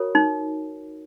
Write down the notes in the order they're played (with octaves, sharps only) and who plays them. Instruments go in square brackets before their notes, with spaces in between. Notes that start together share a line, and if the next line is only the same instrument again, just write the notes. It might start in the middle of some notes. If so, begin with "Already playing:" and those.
Already playing: [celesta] F#4 A#4 C#5
[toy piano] D#4